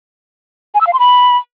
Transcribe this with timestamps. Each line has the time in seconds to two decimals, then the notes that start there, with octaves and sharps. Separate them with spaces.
0.74 G#5
0.81 E6
0.87 F5
0.93 C6
0.99 B5